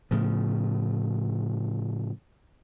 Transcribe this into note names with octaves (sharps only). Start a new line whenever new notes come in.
A2 C#3 F3